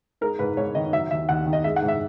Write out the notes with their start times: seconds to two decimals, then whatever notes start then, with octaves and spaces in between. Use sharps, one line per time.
0.21 G#3 A#4
0.39 G#2 B4
0.57 G#2 C#5
0.75 D#3 D#5
0.93 F#3 E5
1.11 D#2 E5
1.29 D#2 F#5
1.46 D#3
1.53 D#5
1.64 G#3 E5
1.76 F#5
1.82 G#2
1.88 E5